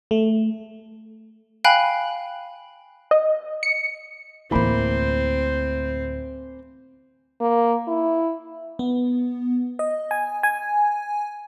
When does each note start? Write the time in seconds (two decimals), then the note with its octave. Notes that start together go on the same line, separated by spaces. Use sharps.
0.11 A3
1.64 F5 G5 G#5 B5 F#6
3.11 D#5
3.63 C#7
4.51 D2 A2 E3 A#3 C4 B5
7.41 A#3
7.88 E4
8.79 B3
9.79 D#5
10.11 G#5
10.43 G#5